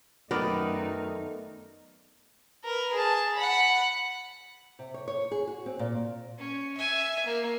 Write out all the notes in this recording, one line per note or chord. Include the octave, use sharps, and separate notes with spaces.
F#2 D#3 A3 B3 D#4 A#4 D5
A#4 B4
G#4 A5
F#5 B5
C3
C#5
C#5
G#4
F#4
C4
A#2
C#4
E5 G#5
A#3